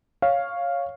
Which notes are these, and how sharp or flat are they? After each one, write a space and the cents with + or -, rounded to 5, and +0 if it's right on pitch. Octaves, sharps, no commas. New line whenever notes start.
C#5 +0 F5 +0